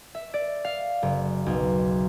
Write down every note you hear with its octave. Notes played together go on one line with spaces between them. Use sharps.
E5
D5
F5
F#1
B1